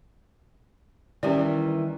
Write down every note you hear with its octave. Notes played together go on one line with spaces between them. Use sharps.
D#3 E3 G3 C#4 G4 D5